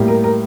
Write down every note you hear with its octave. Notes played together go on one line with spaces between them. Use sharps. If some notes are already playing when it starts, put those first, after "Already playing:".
Already playing: A2 G3 A#3
A#4
A#4